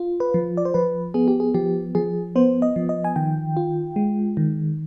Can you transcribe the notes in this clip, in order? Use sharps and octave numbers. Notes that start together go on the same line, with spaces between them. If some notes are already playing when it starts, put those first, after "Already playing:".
Already playing: F4
B4
F3
D5
C5
F3 B4
B3 G#4
G4
G#4
F3 G4
F3 G#4
B3 C5
D#5
F3
D#5
G#5
D#3 G5
F4
G#3
D#3